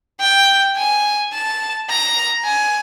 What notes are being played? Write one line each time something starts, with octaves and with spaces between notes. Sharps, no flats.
G5
G#5
A5
A#5
G#5